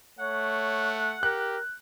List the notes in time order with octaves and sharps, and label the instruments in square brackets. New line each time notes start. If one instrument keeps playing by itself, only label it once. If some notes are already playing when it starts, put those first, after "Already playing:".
[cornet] A3 [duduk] C#5 [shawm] F#5
[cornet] G4 [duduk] A#4 [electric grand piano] F#6